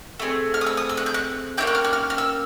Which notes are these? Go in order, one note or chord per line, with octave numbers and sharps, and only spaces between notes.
A3 C4 G#4
F6
D#6
E6
D#6
E6
F#6
G6
F#6
A#3 C#4 E4 G4 G6
F#6
F6
F#6
F6
F6
E6